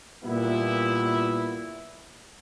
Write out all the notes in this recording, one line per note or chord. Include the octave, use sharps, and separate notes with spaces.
A#2 G3 B3 E4